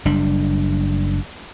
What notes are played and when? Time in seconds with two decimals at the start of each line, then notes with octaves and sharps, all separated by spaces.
0.05 F#1 G3 D4